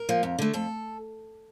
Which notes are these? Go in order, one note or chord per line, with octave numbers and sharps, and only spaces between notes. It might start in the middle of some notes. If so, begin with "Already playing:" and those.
Already playing: A#4
F3 A#3
F2
D3 A3
F2 A4